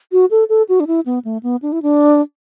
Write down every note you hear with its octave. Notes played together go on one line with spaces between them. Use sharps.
F#4
A4
A4
F#4
D4
E4
B3
A3
B3
D4
E4
D4